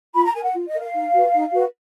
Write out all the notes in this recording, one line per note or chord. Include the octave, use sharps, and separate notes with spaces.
F4 B5
A#5
A#4 G#5
F#5
F4
D#5
A#4
F5
D#4
F#4 B4
D#4
F#4 B4